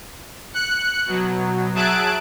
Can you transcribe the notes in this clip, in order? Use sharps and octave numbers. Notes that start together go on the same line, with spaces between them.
F#6 C#7
B2 F#3
F#3 G#4 E5 A5 F#6 D7